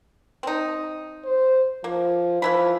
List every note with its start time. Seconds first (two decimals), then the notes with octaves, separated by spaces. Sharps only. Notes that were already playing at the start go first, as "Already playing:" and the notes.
0.43 C4 D#4
1.25 C5
1.84 F3 A#3
2.42 E3 F3 E4 B5